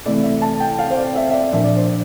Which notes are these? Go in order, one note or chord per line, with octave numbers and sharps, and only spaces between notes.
C3 E3 A3 E4 D5
E5
A5
G5
F5
C5
D5
E5
E5
D5
A#2 F3 A#3 D4 E5
D5
C5
D5